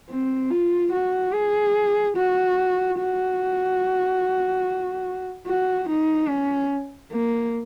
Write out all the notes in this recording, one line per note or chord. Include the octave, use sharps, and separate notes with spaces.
C4
F4
F#4
G#4
F#4
F#4
F#4
D#4
C#4
A#3